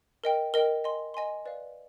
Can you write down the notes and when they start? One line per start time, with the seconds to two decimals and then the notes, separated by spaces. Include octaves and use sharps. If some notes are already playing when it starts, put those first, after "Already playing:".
0.24 A#4 D#5 G5
0.54 A#4 D#5 G5
0.84 D#5 G#5 C6
1.14 D#5 G#5 C6
1.46 B4 D5 F5